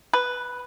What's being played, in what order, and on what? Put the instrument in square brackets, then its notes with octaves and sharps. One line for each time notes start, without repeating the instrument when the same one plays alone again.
[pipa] B4